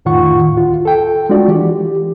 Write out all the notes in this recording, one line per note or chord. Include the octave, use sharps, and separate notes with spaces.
F2 A2 D#3 F4 F#5 C#6
D2 F4
A4 G5
G#3 D4 F4 F#4 D5
E3 G4